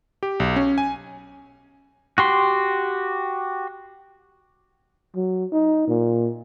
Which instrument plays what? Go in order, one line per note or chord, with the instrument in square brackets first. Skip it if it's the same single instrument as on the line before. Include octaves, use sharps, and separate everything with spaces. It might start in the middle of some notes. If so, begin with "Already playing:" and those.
[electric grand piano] G4
B1
C#4
G#5
[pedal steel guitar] F#4 G4 C6
[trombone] F#3
D#4
A#2